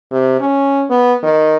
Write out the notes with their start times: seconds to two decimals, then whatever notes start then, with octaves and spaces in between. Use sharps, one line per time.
0.11 C3
0.40 C#4
0.90 B3
1.23 D#3